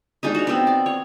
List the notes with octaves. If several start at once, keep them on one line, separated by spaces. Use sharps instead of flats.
G#3 D4 D#4
F#4 C#5
B3 C4
D5
C#5